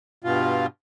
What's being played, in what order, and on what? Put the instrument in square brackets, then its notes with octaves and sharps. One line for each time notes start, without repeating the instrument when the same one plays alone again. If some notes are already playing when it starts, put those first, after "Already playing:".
[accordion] G2 B2 F4